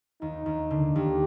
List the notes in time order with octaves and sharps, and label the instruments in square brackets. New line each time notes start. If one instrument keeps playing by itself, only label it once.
[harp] D#2 [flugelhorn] D#4
[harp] D#2
D3
[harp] D#2 [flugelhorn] G4